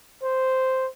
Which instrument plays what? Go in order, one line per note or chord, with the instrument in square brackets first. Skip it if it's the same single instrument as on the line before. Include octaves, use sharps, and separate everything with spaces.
[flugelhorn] C5